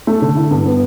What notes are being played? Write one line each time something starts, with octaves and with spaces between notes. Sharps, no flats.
A3
D3
E4
G2
B3